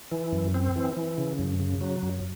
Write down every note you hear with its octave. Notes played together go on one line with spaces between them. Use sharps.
E3
F#2
C4
E3
E3
C#3
F#2
C#3
F#3
F#2